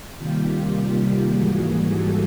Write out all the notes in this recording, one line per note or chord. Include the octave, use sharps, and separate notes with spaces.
C3 D#3 G3 A#3 F4 G4
G#2 E3 G3 A#3 F#4 G#4
G4 A4